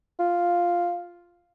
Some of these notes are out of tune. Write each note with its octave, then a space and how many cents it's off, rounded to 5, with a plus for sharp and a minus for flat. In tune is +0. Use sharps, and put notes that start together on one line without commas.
F4 +0